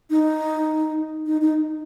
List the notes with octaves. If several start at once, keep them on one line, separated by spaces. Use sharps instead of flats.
D#4
D#4
D#4